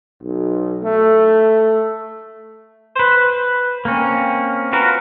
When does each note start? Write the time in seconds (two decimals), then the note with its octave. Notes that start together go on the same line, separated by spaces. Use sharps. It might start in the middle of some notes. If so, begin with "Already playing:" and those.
0.22 B1
0.84 A3
2.95 B4 C5
3.85 A#3 C4 C#4
4.73 F4 F#4 A#4 B4